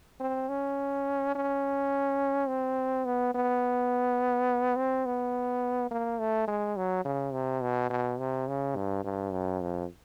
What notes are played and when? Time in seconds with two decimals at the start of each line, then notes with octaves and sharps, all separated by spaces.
0.20 C4
0.49 C#4
1.35 C#4
2.48 C4
3.05 B3
3.35 B3
4.76 C4
5.06 B3
5.91 A#3
6.19 A3
6.48 G#3
6.77 F#3
7.05 C#3
7.33 C3
7.62 B2
7.90 B2
8.19 C3
8.48 C#3
8.76 G2
9.04 G2
9.32 F#2
9.62 F2